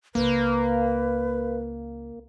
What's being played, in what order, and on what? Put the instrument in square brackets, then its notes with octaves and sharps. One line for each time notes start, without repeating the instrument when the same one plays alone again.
[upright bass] C#2 [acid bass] A#3 [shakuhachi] B4